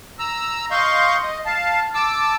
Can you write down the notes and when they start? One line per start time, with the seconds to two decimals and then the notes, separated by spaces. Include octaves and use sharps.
0.19 A#5 E6
0.71 D#5 F5 C6 C#6 G6
1.23 D#5
1.46 F5 A5
1.94 A5 D6 E6